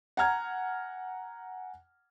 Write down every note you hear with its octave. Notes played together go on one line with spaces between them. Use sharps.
F#5 G#5 A#5 F6 G#6